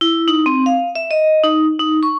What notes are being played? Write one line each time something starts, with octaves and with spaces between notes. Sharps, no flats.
E4
D#4
C4
F5
E5
D#5
D#4
D#4
C#6